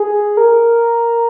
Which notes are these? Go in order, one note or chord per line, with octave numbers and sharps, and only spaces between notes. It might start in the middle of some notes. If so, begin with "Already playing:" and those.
Already playing: G#4
A#4